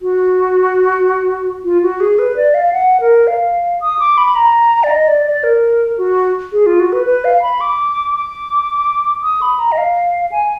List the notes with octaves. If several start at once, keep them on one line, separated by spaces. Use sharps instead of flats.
F#4
F4
F#4
G#4
B4
D5
F5
F#5
A#4
F5
D#6
D6
B5
A#5
D5
D#5
D5
D5
A#4
F#4
G#4
F4
F#4
B4
B4
F5
B5
D6
D6
D#6
B5
A#5
D#5
F5
G#5